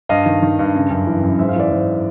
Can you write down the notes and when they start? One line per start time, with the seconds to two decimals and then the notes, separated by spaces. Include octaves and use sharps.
0.09 G2 D#5 F5
0.26 D#3
0.42 D#3
0.59 G2
0.75 C#3
0.90 F#2
1.07 E3
1.23 F#2
1.39 G#2 E5
1.49 F5
1.56 E3 D5 E5
1.71 G#2